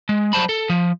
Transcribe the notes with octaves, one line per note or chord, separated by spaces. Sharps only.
G#3
F#3 G3 C5 A5 B5
A4
F3